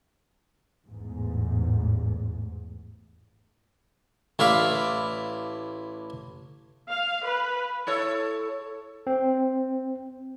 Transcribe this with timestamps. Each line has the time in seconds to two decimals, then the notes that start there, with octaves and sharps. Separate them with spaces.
0.85 A1 E2 G#2
4.39 A1 E4 D5 F5 B5
6.90 F5
7.27 B4
7.87 E4 A4 C#5
9.07 C4